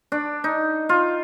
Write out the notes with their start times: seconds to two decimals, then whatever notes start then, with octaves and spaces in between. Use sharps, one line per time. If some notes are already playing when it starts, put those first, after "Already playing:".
0.12 D4
0.44 D#4
0.89 F4